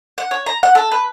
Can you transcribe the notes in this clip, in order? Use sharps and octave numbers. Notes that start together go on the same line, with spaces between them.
F#5
C#5
A#5
F#5
A4
B4